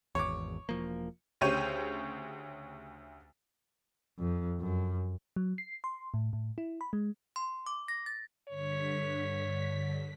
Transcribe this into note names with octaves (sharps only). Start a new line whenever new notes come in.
G#1 E2 C#5 D6
E1 F3 A#3
D2 C#3 G4 C5 C#5 D#7
F2
F#2
F#3
C7
C6
A2
A2
E4
B5
G#3
C6
D6
A#6
A6
G2 D3 C#5 B6